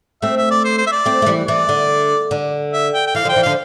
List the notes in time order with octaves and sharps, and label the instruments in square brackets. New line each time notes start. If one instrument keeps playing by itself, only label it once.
[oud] A3 C4 [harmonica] E5
[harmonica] E5
D5
C5
C5
E5
D5
[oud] A3 C4
A3
E3 G3
[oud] E3 [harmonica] D5
[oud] D3
D3
[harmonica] E5
G5
G5
[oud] E3 [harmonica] F5
[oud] D3 F3
[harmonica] G5
[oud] E3
[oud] D3 F3 [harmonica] F5